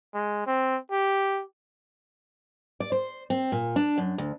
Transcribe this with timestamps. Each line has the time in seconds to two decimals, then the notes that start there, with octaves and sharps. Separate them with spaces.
0.15 G#3
0.47 C4
0.91 G4
2.80 D5
2.92 C5
3.30 C4
3.52 A#2
3.76 D4
3.98 F#2
4.18 D2